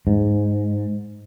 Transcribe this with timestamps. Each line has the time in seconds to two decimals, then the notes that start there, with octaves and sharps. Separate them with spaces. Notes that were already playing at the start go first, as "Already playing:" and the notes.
0.07 G#2